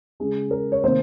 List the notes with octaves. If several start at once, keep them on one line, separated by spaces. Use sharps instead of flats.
C#3 G#3 G#4
A#4
C#5
C3 D#3 A#3 C5